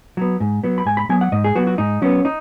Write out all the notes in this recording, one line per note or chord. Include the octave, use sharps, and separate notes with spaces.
F#3 B3
G#2
F#3 B3
B5
G#2 G#5
B5
F#3 B3 G#5
F#5
G#2 D#5
G#4
F#3 B3 F#4
F#4
G#2 D#4
F#3 B3 C#4
D#4